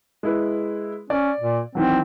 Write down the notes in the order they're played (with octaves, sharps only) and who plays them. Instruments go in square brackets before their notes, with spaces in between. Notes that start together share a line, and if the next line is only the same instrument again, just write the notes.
[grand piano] G#3 E4 B4
[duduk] C#4 [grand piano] D5
[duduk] A#2
[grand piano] D#3 E3 F#3 [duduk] C4